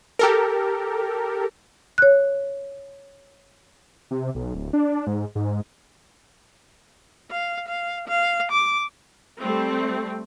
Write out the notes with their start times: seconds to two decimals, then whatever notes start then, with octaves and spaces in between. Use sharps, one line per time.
0.19 G4 A4 A#4
1.98 C#5 F#6
4.11 C3
4.35 B1
4.54 D1
4.73 D4
5.07 G#2
5.35 G#2
7.31 F5
7.67 F5
8.07 F5
8.51 D6
9.40 G3 A3 C4